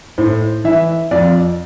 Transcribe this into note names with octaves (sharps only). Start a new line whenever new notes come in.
A2 C5
E3 E5
F2 D5